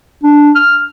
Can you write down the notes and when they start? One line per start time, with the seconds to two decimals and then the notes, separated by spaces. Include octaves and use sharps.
0.23 D4
0.56 F6